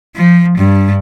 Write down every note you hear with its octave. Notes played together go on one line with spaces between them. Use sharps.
F3
G2